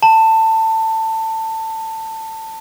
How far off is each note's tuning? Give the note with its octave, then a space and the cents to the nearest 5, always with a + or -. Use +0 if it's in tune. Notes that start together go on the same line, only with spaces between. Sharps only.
A5 +20